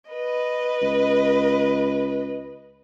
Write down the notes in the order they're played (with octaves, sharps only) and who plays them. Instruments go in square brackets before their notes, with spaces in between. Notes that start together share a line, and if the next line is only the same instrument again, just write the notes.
[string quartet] B4 D#5
[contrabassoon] C#2